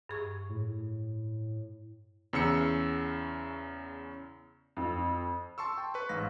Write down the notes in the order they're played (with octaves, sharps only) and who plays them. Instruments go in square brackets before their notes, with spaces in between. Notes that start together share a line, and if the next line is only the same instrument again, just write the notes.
[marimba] G2 G#4 C#6
[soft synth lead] A2
[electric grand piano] E2 C#3 E6 C#7
[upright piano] F2
[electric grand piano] A5 C6 C#6 E6
G5
B4 C#6
A1 G#2 F5 A#6